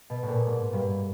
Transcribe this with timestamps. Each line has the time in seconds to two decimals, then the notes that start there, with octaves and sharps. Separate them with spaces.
0.10 B2
0.23 A2
0.28 A#2
0.46 G#2
0.73 G2